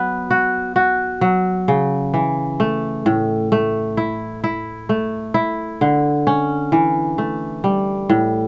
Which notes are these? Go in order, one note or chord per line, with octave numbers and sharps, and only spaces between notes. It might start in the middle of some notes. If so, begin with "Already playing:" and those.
Already playing: F#3 B3
F#4
F#4
F#3
C#3
E3
A3
A2
A3
E4
E4
A3
E4
D3
C#4
E3
A3
G3
A2